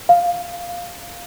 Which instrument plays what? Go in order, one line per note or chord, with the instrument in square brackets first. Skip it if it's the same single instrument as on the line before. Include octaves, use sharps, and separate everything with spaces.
[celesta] F5